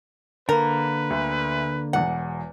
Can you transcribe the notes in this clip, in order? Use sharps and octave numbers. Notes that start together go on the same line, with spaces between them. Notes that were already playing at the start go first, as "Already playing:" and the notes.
D3 A#3 A#4 B4
D2
E1 E2 F#5